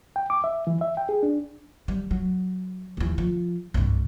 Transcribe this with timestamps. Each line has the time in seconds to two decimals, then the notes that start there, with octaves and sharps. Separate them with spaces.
0.16 G5
0.30 D6
0.44 E5
0.67 E3
0.81 E5
0.97 G5
1.09 G#4
1.23 D4
1.88 G3
2.11 F#3
2.97 D#2 E3
3.18 F3
3.74 C2 G2